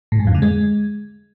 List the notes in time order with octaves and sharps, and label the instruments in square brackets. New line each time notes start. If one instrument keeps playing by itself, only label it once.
[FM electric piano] A2
G#2
F2
D3
G#3